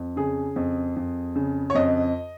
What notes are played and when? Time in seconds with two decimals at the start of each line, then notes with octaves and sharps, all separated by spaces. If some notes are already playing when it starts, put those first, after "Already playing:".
Already playing: F2
0.16 C#3 G#4
0.56 F2
0.96 F2
1.35 C#3
1.70 C#5
1.75 F2 D#5